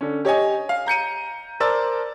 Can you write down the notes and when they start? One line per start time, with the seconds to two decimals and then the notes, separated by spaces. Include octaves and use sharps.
0.01 D3 C#4
0.25 G4 C#5 D#5 G#5
0.69 F5
0.86 A#5 G6 C#7 D#7
1.60 A#4 C5 D5 A5 E6 A6